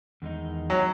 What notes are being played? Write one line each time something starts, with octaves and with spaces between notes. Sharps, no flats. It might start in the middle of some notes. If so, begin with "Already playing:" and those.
E2 D#3 G#3 D#4
F#3